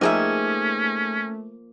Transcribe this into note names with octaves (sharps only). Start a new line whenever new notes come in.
F3 A3 A#3 C#4 D#4 G#4 E5 G5